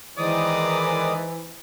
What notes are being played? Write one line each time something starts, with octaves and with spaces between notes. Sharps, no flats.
D#3 E3 G#3 C5 D5 A#5 D#6